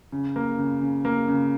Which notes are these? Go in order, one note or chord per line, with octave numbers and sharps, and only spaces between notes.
C#3
A#3
C#3
C#3
A#3
C#3